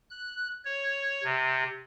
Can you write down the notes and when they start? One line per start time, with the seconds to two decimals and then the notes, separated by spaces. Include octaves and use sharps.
0.11 F#6
0.65 C#5
1.24 C3